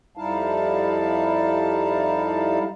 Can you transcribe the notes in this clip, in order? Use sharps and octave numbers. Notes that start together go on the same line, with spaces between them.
F2 G3 D#4 E4 F5 A5